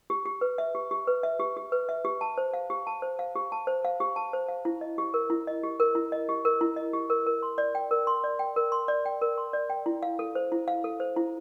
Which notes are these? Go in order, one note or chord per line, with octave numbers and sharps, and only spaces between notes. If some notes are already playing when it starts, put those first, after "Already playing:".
G4
G4
B4
E5
G4
G4
B4
E5
G4
G4
B4
E5
G4
A5
C5
F5
G4
A5
C5
F5
G4
A5
C5
F5
G4
A5
C5
F5
E4
D#5
G4
A#4
E4
D#5
G4
A#4
E4
D#5
G4
A#4
E4
D#5
G4
A#4
A#4
C6
D5
G5
A#4
C6
D5
G5
A#4
C6
D5
G5
A#4
C6
D5
G5
E4
F5
A4
C5
E4
F5
A4
C5
E4